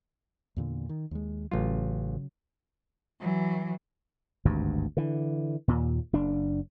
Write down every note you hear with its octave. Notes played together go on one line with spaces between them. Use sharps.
E2 A#2 D3
D#3
D#2 G#3
A1 C#3 F#3 F4
E3 F#3
G#1 D2 G2
D3 E3
D#2 A#2
F#1 D4